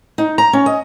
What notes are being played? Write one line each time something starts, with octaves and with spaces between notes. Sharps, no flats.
D#4
A#5
C#4
D#5